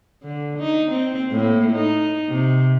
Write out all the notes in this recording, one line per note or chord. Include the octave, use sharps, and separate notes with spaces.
D3
D#4
C4
A2 A#3
D#4
C3